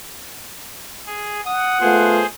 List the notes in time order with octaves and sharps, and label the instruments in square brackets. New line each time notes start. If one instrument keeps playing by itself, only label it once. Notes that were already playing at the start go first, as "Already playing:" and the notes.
[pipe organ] G#4
[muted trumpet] F#5 [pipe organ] D#6
[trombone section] A3 B3 F4 [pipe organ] G#4 C5